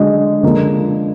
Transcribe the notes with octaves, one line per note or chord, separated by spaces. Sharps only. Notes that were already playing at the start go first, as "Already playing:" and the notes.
Already playing: D3 F#3 G#3 D4
D3 F3 A#3